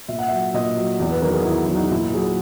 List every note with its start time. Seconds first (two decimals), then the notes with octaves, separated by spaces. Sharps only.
0.08 A#2 E5
0.19 F#5
0.28 F#3 E5
0.54 A#2 D#5
0.77 F#3
1.00 E2
1.11 B4
1.22 D#3 F#3 A#4
1.33 G#4
1.45 E2 E4
1.68 D#3 F#3
1.75 D#4
1.90 A#2 E4
2.13 F#3 G#4